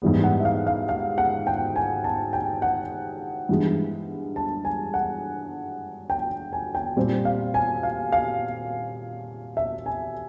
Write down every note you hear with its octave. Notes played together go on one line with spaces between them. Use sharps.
G#2 E3 G3 B3
F#5
E5
F5
F5
F5
F#5
G5
G#5
A5
G5
F#5
G2 E3 G#3
A5
G#5
F#5
G5
G#5
G5
A#2 G3 C4
F5
G#5
F5
F5
E5
G#5